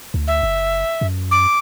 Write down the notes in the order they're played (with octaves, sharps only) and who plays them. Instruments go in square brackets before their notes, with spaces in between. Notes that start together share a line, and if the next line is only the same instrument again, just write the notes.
[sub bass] D2
[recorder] E5
[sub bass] F#1
F#2
[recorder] D6